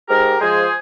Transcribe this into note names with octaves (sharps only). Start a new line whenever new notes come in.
G#2 G4 A#4
F3 G#3 G#4 C5